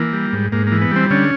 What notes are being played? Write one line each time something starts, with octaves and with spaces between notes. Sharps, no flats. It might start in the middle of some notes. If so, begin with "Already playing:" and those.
Already playing: E3 A#3
G3
G#2
G#2 A#3
E3 A#3
B3
G3 C4
D3 C#4